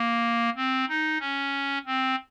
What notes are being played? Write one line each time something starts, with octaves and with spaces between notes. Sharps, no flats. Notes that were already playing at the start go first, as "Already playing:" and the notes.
Already playing: A#3
C4
D#4
C#4
C4